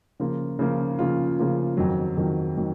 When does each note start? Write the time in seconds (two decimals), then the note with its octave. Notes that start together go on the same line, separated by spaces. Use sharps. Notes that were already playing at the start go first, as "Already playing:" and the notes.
0.20 C#3 F3 A#3 F4
0.59 C#3 F3 A#3 F4
0.99 C#3 F3 A#3 F4
1.39 C#3 F3 A#3 F4
1.77 F2 D#3 F#3
2.17 F2 D#3 F#3
2.58 D#3 F#3